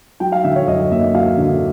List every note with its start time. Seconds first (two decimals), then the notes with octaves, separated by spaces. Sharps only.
0.20 F#3 G5
0.32 F5
0.44 D3 E5
0.56 C#5
0.67 F#2 D#5
0.91 A#3 E5
1.14 F#3 F5
1.38 D3